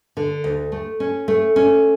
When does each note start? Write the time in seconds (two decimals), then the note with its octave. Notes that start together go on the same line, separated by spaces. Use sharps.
0.17 D3
0.44 D2
0.72 A3
1.00 C#4
1.28 A3
1.56 C#4